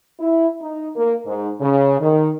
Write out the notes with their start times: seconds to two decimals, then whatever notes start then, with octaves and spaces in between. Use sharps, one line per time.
0.20 E4
0.61 D#4
0.96 A#3
1.26 G#2
1.61 C#3
2.00 D#3